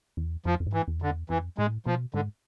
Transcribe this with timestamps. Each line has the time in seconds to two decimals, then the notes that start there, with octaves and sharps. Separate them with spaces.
0.17 E2
0.45 F2 F3
0.60 F2
0.66 G#2
0.73 E3
0.88 E2
0.99 F2 D3
1.09 E2
1.30 F2 E3
1.58 A2 G#3
1.86 B2 F3
2.14 G#2 D3